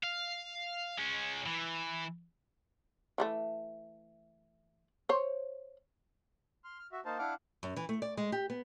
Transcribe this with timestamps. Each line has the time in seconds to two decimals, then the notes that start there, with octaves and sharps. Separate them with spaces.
0.03 F5
0.98 G#3 C#4
1.46 E3
3.18 E3 G#3 A3
5.09 C5 C#5
6.64 C6 F6
6.79 F6
6.92 F#4 E5
7.05 A#3 D#4 C5 F5 A5
7.18 D4 E4 F5 F#5 D6 F6
7.63 F#2
7.76 E3
7.89 A3
8.02 D5
8.17 G#3
8.32 G4
8.50 B3